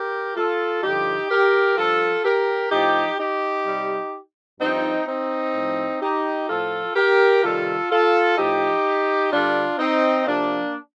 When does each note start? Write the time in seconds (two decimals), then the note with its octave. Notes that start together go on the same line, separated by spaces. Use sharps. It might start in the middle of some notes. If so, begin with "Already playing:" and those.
Already playing: G4 A#4
0.36 F4 A4
0.83 G2 D3 F3 D#4 G4
1.30 G4 A#4
1.77 G2 F3 F4 A4
2.25 G4 A#4
2.71 A2 F3 D#4 G4
3.19 D#4 G4
3.66 C3 G3
4.60 G2 F3 C4 D#4
5.08 C4 D#4
5.55 A2 F3
6.02 D#4 G4
6.49 A2 F3 F4 A4
6.96 G4 A#4
7.43 C3 D#3 G3 F4 A4
7.90 F4 A4
8.38 A2 F3 D#4 G4
9.32 G2 D3 G3 D4 F4
9.79 C4 D#4
10.26 C3 F3 A#3 D4